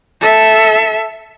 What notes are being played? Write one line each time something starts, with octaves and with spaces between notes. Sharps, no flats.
A4 E5